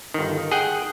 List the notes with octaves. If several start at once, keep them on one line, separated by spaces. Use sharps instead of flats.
G1 D#3
G#4 F#5 G5